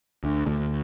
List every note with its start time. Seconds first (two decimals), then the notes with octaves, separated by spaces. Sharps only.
0.24 D2
0.46 D2